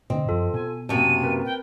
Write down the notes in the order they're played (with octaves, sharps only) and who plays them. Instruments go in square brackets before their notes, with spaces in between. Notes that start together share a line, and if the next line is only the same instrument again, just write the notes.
[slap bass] B2 D3 D4 [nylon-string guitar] C4 [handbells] D#5
[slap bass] F#2 F3 [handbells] F4 A4
[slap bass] B2 [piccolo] G#5
[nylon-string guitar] F#2 C3 A#3 [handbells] C4 A5 [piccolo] D#7
[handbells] C4 A#4 B4
[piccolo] G5